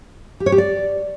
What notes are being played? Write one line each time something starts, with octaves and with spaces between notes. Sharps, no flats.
G4
C#5
G4
D5